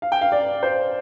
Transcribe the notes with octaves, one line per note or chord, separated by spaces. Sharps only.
F5
G5
F5
D5
C5